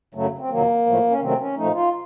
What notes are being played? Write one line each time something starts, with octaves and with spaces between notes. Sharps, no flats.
F#2 C#3 F#3 A3
C4
F2 C3 D#3 F#3 A#3
A2 F3 A3
C#4
C3 D#3 F#3 A3 C4
C#4
A#2 F3 A3 D#4
F4